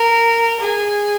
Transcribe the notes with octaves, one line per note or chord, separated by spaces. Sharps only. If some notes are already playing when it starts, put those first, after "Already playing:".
Already playing: A#4
G#4